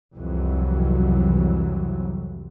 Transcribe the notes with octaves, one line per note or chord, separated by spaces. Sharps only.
C2 F2 E3 F#3